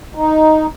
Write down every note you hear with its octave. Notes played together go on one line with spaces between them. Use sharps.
D#4